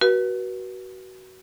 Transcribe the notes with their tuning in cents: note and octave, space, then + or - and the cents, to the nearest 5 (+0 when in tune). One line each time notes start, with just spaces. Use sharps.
F#4 +20 B4 -35